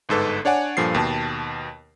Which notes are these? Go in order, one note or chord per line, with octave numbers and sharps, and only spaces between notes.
G1 G#2 A4 B4
D4 C#5 D5 F#5 G#5
G2 A#2 F3 A4 C7
D#2 B2 A5